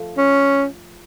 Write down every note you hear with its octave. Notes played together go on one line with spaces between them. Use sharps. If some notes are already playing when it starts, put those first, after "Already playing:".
Already playing: F3 A3
C#4